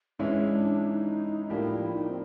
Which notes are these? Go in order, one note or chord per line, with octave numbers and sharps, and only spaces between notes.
G#2 E3 G#3 C#4 D4 E4
D#4
A2 F3 A#3 D4 E4 G4
E4
D#4
C4